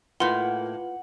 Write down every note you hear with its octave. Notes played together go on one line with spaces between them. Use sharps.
A2 A#3 F4 B4 F#5 C6